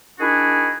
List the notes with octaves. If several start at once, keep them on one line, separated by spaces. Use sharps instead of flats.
D#3 D4 E4 F#4 G#4